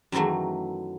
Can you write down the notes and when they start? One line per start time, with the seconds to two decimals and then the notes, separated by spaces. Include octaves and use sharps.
0.12 F#2 D#3 E3 F#3 A3